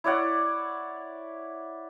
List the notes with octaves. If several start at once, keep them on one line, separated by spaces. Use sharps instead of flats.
E4 C#5 D5 F#5